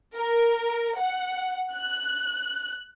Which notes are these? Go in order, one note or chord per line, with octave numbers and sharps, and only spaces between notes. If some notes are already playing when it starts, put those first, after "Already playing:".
A#4
F#5
F#6